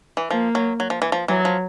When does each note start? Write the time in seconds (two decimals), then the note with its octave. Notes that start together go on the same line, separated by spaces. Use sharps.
0.17 E3
0.30 F3 A#3
0.55 F#3
0.80 F#3
0.90 F3
1.02 E3
1.12 F3
1.28 E3 F#3
1.45 F3